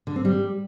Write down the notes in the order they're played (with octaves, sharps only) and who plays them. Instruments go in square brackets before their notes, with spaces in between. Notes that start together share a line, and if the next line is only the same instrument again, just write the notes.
[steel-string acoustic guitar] D3
C4
G3